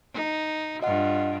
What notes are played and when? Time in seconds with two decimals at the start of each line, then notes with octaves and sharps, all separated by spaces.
0.13 D#4
0.82 G2 F4 D#5 F#5